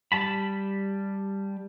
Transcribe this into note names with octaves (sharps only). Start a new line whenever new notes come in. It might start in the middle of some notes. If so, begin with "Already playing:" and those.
G3 A5 B5